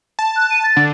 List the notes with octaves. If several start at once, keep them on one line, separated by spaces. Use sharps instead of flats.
A5
F#6
D#7
A6
D3